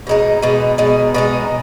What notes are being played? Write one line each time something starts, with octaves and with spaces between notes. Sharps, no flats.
B2 G#3 D#4
B2 G#3 D#4
B2 G#3 D#4
B2 G#3 D#4